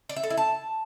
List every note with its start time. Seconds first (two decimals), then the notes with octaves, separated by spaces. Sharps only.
0.09 D5
0.16 E5
0.23 A4
0.30 E4
0.37 A5